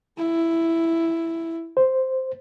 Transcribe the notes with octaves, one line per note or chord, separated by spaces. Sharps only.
E4
C5